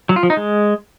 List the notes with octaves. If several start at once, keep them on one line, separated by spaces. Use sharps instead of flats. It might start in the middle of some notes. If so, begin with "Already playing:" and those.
F#3
F4
F3
D#4
G#3